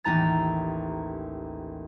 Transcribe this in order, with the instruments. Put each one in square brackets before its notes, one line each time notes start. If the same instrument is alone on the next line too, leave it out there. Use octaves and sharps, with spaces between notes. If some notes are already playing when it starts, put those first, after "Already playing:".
[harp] A1 D#2 D#4 A#5 A6